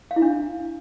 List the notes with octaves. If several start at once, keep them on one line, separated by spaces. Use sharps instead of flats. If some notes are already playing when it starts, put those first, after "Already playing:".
F5
E4
D4